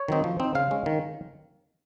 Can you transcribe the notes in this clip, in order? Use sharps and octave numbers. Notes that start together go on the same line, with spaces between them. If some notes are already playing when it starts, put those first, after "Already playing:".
Already playing: C#5
D#3 F#3 C4 D#4
F3
C4 D#4
C#3 F5
G#3 C#4
D#3